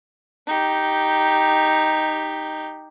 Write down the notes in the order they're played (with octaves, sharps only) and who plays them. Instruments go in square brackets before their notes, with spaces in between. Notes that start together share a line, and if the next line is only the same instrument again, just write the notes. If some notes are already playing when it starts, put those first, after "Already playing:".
[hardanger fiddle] D#4 G4